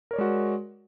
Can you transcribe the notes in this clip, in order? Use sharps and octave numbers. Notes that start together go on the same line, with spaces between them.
G#3 F#4 A#4 C#5 D5